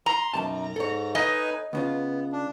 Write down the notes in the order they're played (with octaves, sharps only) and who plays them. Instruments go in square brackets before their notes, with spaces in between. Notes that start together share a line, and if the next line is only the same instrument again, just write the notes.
[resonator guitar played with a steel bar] A#5 [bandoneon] C6
[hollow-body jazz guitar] B1 D#3 A5 [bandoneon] F#2
[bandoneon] G#2 [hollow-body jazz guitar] A4 C#5
[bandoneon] D#4 B4 G#5 [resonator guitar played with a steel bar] D#5
[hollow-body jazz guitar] C#2 C#3 F4 [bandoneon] B3
[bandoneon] D4